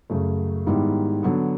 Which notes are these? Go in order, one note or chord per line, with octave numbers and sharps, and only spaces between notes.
F#2 C#3 F#3 A3
G#2 D#3 G3 B3 E4
D3 F#3 B3